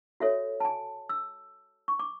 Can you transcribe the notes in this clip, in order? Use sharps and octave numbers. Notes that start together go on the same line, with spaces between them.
F#4 A4 C#5 E5
A5
G#5
E6
C#6
D6